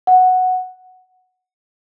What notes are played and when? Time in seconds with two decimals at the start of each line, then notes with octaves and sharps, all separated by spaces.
0.07 F#5